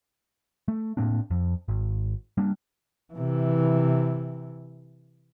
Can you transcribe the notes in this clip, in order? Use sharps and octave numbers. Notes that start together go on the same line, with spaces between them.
A3
A2 A#3 C4 D4
F2
G#1
G3 A#3 D4
C3 E3